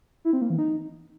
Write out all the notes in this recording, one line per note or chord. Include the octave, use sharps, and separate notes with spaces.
E4
C4
A#3
E3
D#4